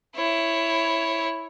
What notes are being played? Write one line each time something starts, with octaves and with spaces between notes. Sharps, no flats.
E4 C#5